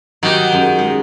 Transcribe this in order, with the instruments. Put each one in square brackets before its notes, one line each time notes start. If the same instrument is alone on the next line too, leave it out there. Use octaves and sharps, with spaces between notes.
[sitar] D#3 [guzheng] F#3 D#4 G4
[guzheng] F#2 G#3
G#3